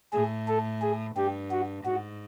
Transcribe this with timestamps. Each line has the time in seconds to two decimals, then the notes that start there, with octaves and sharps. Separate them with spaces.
0.13 A2 G#4
0.48 A4
0.82 G#4
1.16 G2 G4
1.51 F#4
1.85 G#2 F#4